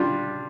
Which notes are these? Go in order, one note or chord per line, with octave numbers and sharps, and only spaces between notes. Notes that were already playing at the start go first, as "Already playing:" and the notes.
Already playing: G3 D4 F4